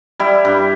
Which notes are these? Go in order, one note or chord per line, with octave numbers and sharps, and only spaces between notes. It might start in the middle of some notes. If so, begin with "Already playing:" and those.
G3 E4
G2